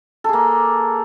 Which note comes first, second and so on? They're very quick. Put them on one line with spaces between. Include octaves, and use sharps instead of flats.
A4 G#4 A#3